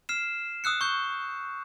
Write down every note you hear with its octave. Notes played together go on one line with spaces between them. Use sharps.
F6 C7 E7
D#6 E6 F#6 C#7
C#6 G6